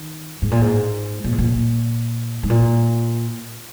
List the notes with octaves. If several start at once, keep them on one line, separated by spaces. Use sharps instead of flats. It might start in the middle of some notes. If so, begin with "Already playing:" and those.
Already playing: D#3
G#2
A#2
G#2
A#2
G#2
A#2
G#2
A#2